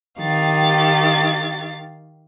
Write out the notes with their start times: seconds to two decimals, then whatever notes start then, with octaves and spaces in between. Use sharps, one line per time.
0.21 D#3 G4 F5 A6